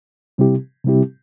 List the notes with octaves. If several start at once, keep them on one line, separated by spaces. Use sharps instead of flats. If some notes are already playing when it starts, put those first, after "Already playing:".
C3 G3 C4 E4 G4
C3 G3 C4 E4 G4